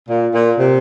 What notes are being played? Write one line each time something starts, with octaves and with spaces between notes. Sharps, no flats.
A#2
A#2
C3